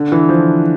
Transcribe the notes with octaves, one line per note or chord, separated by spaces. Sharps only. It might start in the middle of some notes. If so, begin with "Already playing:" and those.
Already playing: D3
E3
F3